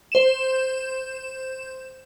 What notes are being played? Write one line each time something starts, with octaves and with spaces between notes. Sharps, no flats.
C5 E7